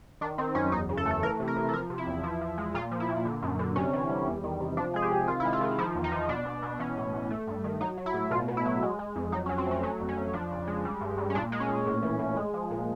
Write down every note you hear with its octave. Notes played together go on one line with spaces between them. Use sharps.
D#3 D4
D#3 C4
F#2 C#4
E2 D#4
C#3
A4
A3
A4
E3 A#4
C3
A#4
C3
A4
F3 A#4
C3
E4
E2
F3 E4
F3
G#3
A#2 F4
F3
E4
A#2
D3
F#2
D3
C3 C#4
E3
G3
E2
D#3
C3
F3 D4
G#3 G#4
G4
C3
D#3 F4
G#3 E4
F4
D#3
F3 E4
E2
D#4
F3
B2 D4
B2
B2
E3 C#4
A2
A2
A3
G2
D#3
F#3 D#4
F#3
E4
A2
B2 F4
B2
E4
F#3
G#3
G#3
F2
F#3 D#4
C#4
F#3
C4
A3 C#4
F#3 C#4
F2
C#4
F2
F3 D4
C#3
G#3
G3
G2
G2
C#4
A#2 D4
G#3
C#4
A#2
A2
E3
A2
G#3
F3
A#2